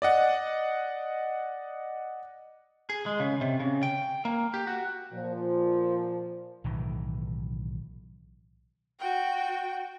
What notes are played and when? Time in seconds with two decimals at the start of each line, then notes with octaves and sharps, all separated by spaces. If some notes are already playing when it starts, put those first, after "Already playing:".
0.02 D5 D#5 F#5
2.90 G#4
3.06 G#3
3.20 C#3
3.41 C3
3.60 C#3
3.83 G5
4.25 A#3
4.54 G4
4.67 F#4
5.13 A#2 F3
6.64 B1 A2 D#3 E3
8.99 F#4 G5